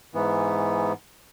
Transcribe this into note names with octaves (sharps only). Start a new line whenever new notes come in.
G#2 E3 B3